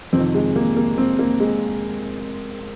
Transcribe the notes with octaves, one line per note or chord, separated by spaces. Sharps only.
F2 C3 D#3 C4
G#3
A#3
A#3
C4
A#3
G#3